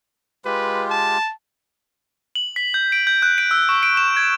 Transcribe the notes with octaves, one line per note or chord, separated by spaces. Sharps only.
G#3 F4 G4 B4
A5
F#7
B6
G6
D7
G6
F#6
D7
E6
C#6
D7
E7
G#6